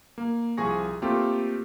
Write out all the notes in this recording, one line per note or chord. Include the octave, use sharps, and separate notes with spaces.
A#3
C2 F3 G#4 G#5 C#6 A#6
A3 A#3 C4 F4 G4 A4